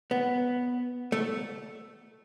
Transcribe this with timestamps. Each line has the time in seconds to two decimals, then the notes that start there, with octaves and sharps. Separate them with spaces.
0.11 B3
1.12 A3